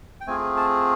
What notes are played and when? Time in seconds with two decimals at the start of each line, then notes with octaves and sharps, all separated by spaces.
0.21 G5
0.27 A3 C4 F4 G#4 G#5
0.57 A5